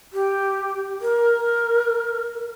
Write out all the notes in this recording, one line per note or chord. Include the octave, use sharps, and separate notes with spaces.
G4
A#4